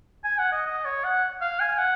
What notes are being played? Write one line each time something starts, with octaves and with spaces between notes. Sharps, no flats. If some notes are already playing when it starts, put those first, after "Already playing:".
G#5
F#5
D#5
D#5
C#5
F#5
F5
G#5
F#5